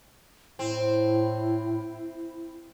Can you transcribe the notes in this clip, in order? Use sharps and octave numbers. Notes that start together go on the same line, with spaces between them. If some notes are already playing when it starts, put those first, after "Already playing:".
A2 C4 E4